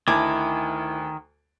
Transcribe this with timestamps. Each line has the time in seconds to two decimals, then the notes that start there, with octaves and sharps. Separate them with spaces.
0.08 D2 D#3 E4 A5 D6